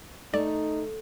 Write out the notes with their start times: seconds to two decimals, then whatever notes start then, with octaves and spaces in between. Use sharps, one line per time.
0.34 A3 D#4 D5